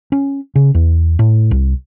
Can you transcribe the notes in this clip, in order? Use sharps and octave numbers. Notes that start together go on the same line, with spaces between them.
C#4
C#3
E2
A2
C2